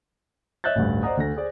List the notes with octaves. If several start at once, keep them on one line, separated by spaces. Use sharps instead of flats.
C#5 D#5 E5 F#6 G6 A6
A1 D2 G2
C5 D5 D#5 F#5 A#5 D#6
D2 D3 A#6
G#4 C5 D5